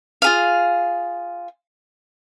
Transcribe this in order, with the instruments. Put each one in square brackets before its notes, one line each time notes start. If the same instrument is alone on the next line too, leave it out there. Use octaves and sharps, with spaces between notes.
[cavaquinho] F4 G#4 F5